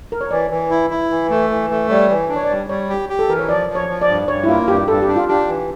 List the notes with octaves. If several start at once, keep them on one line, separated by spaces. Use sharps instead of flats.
A#4
C#5
E3 D5
E3
E4
E4
E3
A3
E3
A3
G3 C#5
E3
D4
C#5
D5
G3
G3 C#5
G4
G4
A4
E3 A#4
C#5
F3 D5
F3
C#5
F3
D5
G2
G2 C#5
E4
A#3 F4
G2 G4
G2 A4
G4
D4
F4
D4 G4
E3